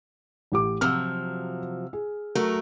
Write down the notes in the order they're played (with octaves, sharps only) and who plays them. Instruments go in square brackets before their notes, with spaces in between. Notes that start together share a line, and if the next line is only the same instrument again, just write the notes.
[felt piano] A1 G4 D6
[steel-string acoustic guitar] C3 F3 F#3 [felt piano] E6 F6
[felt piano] G#4
[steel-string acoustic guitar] F#3 A3 A#4